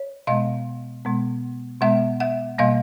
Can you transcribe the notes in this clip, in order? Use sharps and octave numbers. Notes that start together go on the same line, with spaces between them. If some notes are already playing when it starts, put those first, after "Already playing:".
Already playing: C#5
B2 G#3 B3 D#5 F5
B2 G#3 B3
B2 G#3 B3 E5 F#5
E5 F#5
B2 G3 A#3 D#5 F5